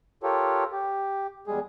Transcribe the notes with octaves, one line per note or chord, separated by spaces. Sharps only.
F4 G4 A4 A#4 C#5
G4
E2 G3 G#3 G#4